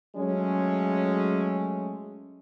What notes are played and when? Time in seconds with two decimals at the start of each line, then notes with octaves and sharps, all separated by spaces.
0.17 F#3 G#3 A3 C#4